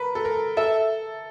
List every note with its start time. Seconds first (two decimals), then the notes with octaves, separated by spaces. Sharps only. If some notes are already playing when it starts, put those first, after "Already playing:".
Already playing: A#4 B4
0.15 A4
0.25 A#4
0.57 A4 E5